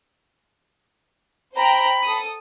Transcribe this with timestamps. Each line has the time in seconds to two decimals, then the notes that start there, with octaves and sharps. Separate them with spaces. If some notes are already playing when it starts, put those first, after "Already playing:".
1.56 C5 G5 A#5 B5
2.05 A4 D#6